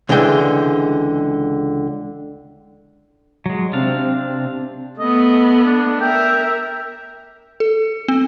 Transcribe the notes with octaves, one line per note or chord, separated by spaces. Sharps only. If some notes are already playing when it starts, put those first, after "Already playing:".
C#2 D3 E3 G#3 G5
F#3 G#3
C3 C4 D4 F5
A3 B3 D#5
D4
A#4 E5 G5
A4
C4